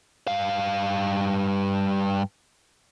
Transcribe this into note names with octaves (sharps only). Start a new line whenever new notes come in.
G2 F5